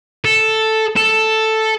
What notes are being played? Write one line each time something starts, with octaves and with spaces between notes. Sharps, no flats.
A4
A4